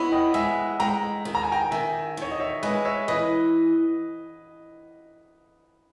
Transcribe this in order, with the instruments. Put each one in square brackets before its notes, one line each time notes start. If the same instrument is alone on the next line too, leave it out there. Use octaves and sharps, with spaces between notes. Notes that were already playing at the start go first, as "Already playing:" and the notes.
Already playing: [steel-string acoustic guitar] B3 E4 [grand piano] B4 C#5 D#5 E5
[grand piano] D#5 G5
[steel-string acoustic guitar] G#3 [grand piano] E5 G#5
[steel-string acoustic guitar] G#3 [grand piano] G5 A#5
[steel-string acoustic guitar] D#3
[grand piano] A#5
G#5
G5 A#5
[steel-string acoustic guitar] D#3 [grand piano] E5 G#5
[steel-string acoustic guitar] D#3 [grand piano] C#5
[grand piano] D#5
C#5 E5
[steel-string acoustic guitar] G#3 [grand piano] B4 D#5
[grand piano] C#5 E5
[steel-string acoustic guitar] E3 [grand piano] B4 D#5